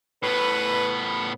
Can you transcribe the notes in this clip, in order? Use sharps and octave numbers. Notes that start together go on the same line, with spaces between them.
A2 B3 B4